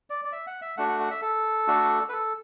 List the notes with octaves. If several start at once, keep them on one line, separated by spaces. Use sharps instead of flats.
D5
D5
E5
F#5
E5
A3 D4 F#4 F#5
F#5
F#5
E5
A4
A3 D4 F#4
B4
A4